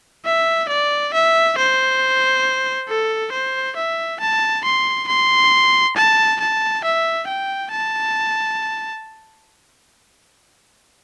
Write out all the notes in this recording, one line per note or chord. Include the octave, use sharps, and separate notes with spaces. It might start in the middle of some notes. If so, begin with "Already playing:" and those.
E5
D5
E5
C5
A4
C5
E5
A5
C6
C6
A5
A5
E5
G5
A5